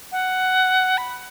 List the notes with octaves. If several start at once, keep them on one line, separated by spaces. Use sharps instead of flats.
F#5
B5